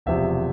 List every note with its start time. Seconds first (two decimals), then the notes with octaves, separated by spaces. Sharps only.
0.06 E1 E2 C3 F3 E5